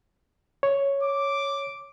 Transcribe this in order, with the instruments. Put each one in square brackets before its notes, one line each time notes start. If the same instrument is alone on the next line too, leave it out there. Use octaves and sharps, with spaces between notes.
[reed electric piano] C#5
[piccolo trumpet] D6